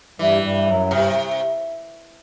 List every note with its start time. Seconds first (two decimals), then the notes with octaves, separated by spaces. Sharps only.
0.19 G2 E3 G3
0.43 G2 G3
0.66 F#2 F#3
0.91 G2 C3 G3